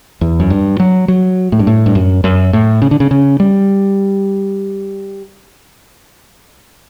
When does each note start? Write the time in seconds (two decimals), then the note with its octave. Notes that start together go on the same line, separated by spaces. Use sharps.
0.21 E2
0.40 F#2
0.50 G2
0.80 F#3
1.08 F#3
1.52 A2
1.59 G2
1.67 A2
1.86 G2
1.95 F#2
2.24 F#2
2.53 A2
2.82 C#3
2.91 D3
3.00 C#3
3.11 C#3
3.40 G3